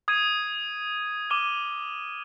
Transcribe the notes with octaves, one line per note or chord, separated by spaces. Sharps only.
D#6 G#6 D#7
D6 F6 G#6 D#7 G7